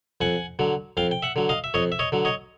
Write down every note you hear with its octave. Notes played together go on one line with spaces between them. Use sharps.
F2 F#5 G#5
D3 F#3
F2 F5 G5
G5
E5 F#5
D3 F#3
D#5 F5
E5
F2 C#5 D#5
E5
C#5 D#5
D3 F#3
C#5 D#5